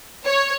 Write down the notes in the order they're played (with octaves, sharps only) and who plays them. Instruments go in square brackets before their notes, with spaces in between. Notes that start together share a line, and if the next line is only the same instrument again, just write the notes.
[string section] C#5